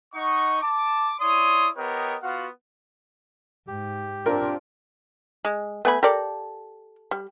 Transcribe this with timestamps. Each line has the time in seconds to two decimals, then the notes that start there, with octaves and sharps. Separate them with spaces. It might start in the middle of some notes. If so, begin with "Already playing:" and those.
0.14 D#4 D#5 F#5 C#6
0.62 A5 D6
1.20 E4 C#5 D5 C6 D#6
1.76 B3 G4 A#4 C#5 D#5 G5
2.23 B3 F4 F#4 F5 F#5
3.67 G#2 G4
4.26 C4 D4 F4 A#4
5.45 G#3
5.85 A3 B3 G#5 B5
6.03 G4 A4 A#4 D5
7.11 G3